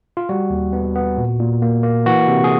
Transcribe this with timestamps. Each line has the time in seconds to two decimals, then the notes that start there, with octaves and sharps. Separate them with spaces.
0.17 F4
0.29 G3 F#4
0.50 D#2
0.73 B3
0.96 B3
1.17 A#2
1.40 A#2
1.62 A#3
1.83 A#3
2.06 E3 F#4
2.28 C3
2.44 G#4